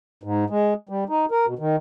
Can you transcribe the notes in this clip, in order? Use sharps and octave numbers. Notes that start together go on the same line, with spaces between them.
G#2
G#3
G3
D#4
A#4
B2
D#3